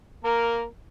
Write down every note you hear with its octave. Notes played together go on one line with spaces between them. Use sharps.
A#3 A#4